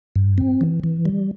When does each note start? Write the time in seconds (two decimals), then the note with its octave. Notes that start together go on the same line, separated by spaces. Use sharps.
0.16 G2
0.38 C4
0.61 E3
0.84 E3
1.05 G3